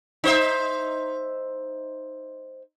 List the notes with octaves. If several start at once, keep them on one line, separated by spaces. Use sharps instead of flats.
D#4 C5 E5